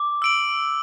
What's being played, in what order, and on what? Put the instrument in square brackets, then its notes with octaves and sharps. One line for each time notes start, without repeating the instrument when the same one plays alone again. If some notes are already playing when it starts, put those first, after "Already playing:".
Already playing: [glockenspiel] D6
[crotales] E6 D7 F#7